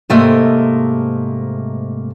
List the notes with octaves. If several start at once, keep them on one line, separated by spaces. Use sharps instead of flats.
G#2 C3 A3 A#3 D#5